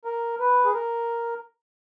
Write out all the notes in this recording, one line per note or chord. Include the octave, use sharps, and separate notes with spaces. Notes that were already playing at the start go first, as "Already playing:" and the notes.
A#4
B4
G#4
A#4